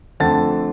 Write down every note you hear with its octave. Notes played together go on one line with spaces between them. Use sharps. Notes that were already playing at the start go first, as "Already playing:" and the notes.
F2 D3 A3 A5 A6